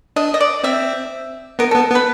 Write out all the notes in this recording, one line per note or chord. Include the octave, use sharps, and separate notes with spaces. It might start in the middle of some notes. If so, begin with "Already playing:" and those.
D4 D#5
D#5
D5
C4 E5
B3 A#4
B3 A4
B3
B4